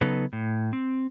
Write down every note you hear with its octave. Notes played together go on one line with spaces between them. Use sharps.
C#3 F#3 B3 D#4 A4 B4
A2
C4